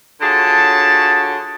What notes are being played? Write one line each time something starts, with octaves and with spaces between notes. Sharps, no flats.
D3 F4 F#4 G#4 C#5 A5